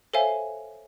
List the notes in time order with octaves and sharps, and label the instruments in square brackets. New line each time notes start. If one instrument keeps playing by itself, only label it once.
[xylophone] A4 C5 C#5 E5 F5 G#5